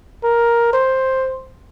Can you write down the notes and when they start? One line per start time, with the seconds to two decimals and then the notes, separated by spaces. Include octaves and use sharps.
0.24 A#4
0.73 C5